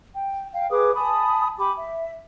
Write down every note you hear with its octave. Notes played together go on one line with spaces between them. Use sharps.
G5
F5 G5
G#4 B4 D6 D#6
G#5 A5 B5 D#6
G4 G#5 B5 D6
E5